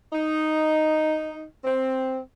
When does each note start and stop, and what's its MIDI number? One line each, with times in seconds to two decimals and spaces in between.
0.13 1.44 63
1.65 2.20 60